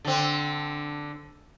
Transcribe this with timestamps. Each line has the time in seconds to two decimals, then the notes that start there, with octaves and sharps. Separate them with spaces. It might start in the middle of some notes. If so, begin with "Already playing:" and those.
0.05 D3 C4